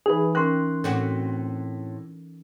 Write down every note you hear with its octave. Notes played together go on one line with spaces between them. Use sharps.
E3 D#4 G#4 B4
C#4 A#4 G5 C6 F#6
A2 C4 F#4 A4